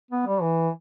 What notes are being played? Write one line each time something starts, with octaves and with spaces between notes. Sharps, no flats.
B3
G3
E3